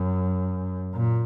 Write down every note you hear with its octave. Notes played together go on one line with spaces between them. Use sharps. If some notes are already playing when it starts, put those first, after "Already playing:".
Already playing: F#2
A#2